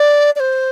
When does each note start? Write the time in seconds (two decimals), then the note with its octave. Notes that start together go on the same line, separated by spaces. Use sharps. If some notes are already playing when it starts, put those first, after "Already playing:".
Already playing: D5
0.36 D5
0.40 C5